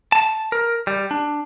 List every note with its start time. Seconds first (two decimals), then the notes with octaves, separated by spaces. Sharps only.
0.12 A5
0.52 A#4
0.87 G3
1.11 D4